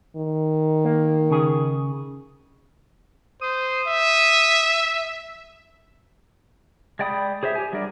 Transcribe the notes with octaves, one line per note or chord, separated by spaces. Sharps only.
D#3
A#3
C#3 G#4
C5 D#6
E5
G#3 D5 G5 B5 D#6
G#4 C5 C#5 E5
G4 G#5
F#3 G3 D4 A#4 D5